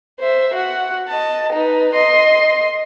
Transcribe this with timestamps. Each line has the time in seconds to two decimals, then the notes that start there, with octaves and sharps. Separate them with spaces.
0.19 C5 E5
0.53 F#4 F#5
1.08 D#5 A5
1.52 D#4 B4
1.93 D#5 C6